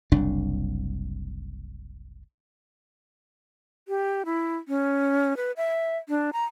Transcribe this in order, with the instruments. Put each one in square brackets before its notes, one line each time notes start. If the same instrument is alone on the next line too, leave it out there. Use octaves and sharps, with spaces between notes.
[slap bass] F#1 C2 D4
[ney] G4
E4
C#4
B4
E5
D4
A#5